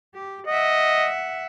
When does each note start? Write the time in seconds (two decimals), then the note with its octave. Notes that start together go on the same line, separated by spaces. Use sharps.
0.14 G4
0.48 D#5 E5 F#5